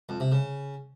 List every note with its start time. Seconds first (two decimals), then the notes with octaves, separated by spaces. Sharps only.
0.09 F2
0.20 C3
0.32 C#3